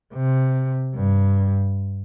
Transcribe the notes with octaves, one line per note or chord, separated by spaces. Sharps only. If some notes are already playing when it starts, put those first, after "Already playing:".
C3
G2